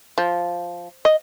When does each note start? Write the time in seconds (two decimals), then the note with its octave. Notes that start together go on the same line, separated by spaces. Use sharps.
0.18 F3
1.05 D#5